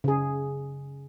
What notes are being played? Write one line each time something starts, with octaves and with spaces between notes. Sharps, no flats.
C#3 G#4